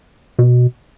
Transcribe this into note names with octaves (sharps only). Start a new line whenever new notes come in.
B2